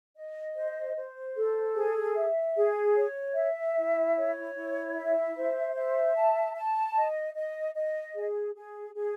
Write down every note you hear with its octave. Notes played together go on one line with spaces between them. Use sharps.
D#5
C5
C5
A4
G#4
E5
G#4
C#5
E5
E4
C#5
E4
E5
C5
E5
A5
A5
D#5
D#5
D#5
G#4
G#4
G#4